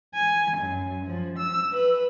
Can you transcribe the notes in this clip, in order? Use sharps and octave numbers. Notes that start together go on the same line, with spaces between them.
G#5
F#2
F3
E6
B4